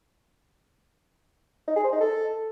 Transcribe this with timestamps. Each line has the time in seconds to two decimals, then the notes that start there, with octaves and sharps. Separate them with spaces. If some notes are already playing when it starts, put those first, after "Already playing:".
1.68 D#4
1.76 G#4
1.84 C5
1.92 D#4
2.01 A4